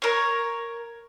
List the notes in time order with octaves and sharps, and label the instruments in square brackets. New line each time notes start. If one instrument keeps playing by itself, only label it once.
[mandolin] A#4 C#5